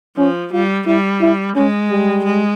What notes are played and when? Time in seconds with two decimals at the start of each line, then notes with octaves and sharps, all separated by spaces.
0.17 F3 C#4
0.52 G3 F4
0.86 G3 E4
1.21 E4
1.56 G#3 C#4
1.91 G3
2.24 G#3